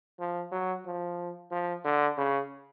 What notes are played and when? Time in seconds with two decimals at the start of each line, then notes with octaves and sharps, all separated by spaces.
0.20 F3
0.52 F#3
0.86 F3
1.51 F3
1.85 D3
2.17 C#3